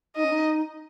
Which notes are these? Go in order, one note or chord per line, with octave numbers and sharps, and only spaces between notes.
D#4 D#5
C#4
D#4